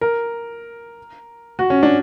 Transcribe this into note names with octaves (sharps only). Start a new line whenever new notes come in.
A#4
F#4
C#4
D4